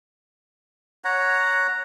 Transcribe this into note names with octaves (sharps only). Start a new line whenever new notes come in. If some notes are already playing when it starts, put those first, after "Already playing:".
C#5 F#5 A#5